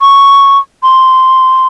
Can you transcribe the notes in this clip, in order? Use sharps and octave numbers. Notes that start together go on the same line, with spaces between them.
C#6
C6